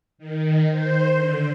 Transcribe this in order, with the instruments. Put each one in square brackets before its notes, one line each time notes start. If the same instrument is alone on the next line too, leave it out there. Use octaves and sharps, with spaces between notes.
[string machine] D#3
C5
D3